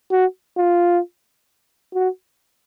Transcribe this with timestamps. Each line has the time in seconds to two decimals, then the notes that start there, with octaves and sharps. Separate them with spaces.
0.11 F#4
0.57 F4
1.94 F#4